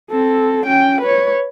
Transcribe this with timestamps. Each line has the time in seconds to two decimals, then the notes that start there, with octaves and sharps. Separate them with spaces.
0.10 C4 A4
0.66 C#4 G5
1.02 B4 C#5